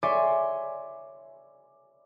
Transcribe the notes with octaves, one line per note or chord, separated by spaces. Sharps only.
C#5 D5 E5 G#5 C6 D6